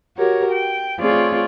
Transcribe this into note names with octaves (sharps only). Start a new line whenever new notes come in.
F#4 G4 A#4 C#5
G5
A3 C4 F4 G#4 C#5 D5